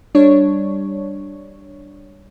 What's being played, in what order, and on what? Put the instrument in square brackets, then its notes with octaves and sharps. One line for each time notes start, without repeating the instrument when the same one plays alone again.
[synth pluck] G3 D4 C#5